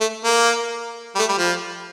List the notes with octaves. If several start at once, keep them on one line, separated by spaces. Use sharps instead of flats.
A3
A#3
G3
A3
G3
F3